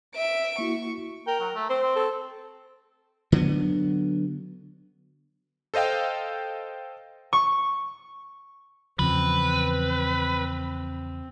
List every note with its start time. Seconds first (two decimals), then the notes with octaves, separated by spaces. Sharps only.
0.16 E5 D7
0.59 A#3 E4 F#4 C#6
1.27 A#4 G5
1.40 F#3
1.55 A3
1.69 C4 C5
1.83 C4
1.96 A4
3.32 D3 F#3 G#3 B3
5.74 A4 C5 D#5 F5 G5
7.33 C#6
8.99 E2 C#3 F3 C4 B4